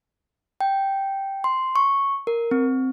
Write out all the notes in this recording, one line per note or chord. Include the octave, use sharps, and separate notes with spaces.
G5
C6
C#6
A#4
C4